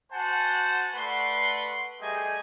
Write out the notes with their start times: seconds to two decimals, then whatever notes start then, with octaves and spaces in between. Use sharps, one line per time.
0.12 F#4 C5 F#5 G#5 A5
0.95 A3 B4 D5 F#5 C6
2.01 G3 A3 G#4 D#5 G5 G#5